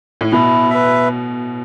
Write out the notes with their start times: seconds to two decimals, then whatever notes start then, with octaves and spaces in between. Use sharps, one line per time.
0.21 A2
0.32 B2 E4
0.70 B4 E5